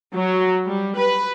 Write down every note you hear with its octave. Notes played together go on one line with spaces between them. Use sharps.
F#3
G3
B4